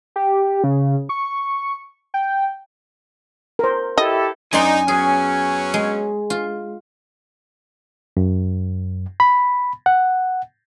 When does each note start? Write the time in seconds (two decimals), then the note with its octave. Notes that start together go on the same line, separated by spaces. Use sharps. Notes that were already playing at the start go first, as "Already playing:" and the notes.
0.16 G4
0.64 C#3
1.09 C#6
2.14 G5
3.59 A#4 C5
3.98 E4 G4 A4 D#5
4.53 F#2 D#4 D5 G#5 C6
4.88 F#3 B3 C#4 G#4
5.74 G#3
6.30 F4
8.17 F#2
9.20 B5
9.86 F#5